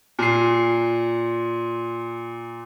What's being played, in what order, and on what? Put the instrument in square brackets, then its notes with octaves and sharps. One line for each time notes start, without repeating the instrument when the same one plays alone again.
[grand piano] A#2 C7